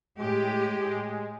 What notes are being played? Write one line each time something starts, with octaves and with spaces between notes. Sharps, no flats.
A2 G#3 G4